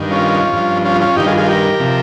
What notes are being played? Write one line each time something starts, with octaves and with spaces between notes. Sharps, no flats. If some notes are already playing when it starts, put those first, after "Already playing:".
Already playing: G2 D#3
C#4 F4
G2 F3
C#4 F4
C#4 F4
G2 D#3 D#4 G4
F4 G#4
F4 G#4
G4 A#4
C3 F3